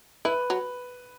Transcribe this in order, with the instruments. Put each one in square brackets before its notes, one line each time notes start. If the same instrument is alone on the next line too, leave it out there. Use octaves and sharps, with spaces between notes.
[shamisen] E4 [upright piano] B4
[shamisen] F#3